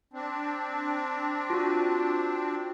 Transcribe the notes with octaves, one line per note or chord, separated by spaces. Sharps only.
C4 D4
F4 F#4